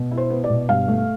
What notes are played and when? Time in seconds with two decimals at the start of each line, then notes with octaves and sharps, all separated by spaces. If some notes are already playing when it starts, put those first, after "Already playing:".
Already playing: B2
0.11 E4
0.18 C5
0.30 B3
0.44 D5
0.50 B2
0.69 G2 F5
0.88 A3